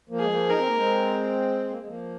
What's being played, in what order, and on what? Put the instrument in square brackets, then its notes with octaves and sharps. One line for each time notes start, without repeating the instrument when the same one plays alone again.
[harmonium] F3 A#3
[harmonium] G#3 [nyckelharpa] G#4
[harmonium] F3 A#3
[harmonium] D#4 [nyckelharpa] A#4
[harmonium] C4
A#3
G#3 C4
A#3
G#3
F3 A#3